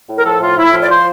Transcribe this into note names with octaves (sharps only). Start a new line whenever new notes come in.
A2
A#4
F3 A4
A2 F4
A2 E4
F3 F4
D5
F3 C5